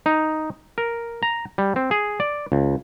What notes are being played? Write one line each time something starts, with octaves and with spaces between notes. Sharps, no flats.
D#4
A#4
A#5
G3
C4
G#4
D5
C#2